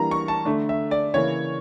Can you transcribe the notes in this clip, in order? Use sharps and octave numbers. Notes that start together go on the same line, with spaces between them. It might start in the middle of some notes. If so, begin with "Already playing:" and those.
Already playing: E3 G3 A#3 D4 A#5
C#6
A5
D3 A3 D4
E5
D5
C#3 E3 A#3 C#5